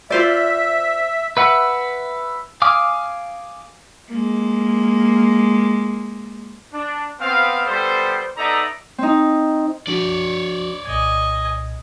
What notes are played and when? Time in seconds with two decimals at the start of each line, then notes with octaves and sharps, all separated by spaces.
0.10 F4 C5 D5 E5
1.37 B4 E5 F#5
2.62 F5 G#5 D6 D#6 F6
4.10 G#3 A#3
6.73 D4
7.20 B3 C4 F5
7.66 G3 B3 A4 C5
8.38 B3 D#4 A4 D5 E5 A#5
8.98 C4 D#4
9.87 F3 D4 F#4 C#5 D5
10.86 C2 A#2 D#5 G#5 G#6